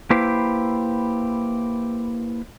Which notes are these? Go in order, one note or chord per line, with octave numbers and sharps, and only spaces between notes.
A#3 E4 G4 B4 C5